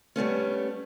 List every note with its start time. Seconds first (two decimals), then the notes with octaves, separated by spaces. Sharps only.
0.16 G3 A3 B3 C#4